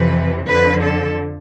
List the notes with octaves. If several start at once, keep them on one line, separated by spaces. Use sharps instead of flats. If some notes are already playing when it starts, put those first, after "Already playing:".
Already playing: F2 C3 E3 B4
F2 D3 F3 B4
A4